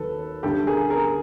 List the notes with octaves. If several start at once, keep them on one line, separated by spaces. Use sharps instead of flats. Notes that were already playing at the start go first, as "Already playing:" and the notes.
Already playing: D#2 D#3 F#3 A4 B4
D2 D3 G3 G4 A4
G#4 A#4
G#4 A#4